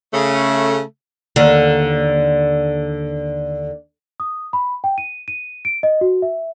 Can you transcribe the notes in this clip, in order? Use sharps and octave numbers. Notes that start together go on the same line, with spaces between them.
C#3 A3
D#2 D3
D#6
B5
G5
D#7
D#7
D7
D#5
F#4
E5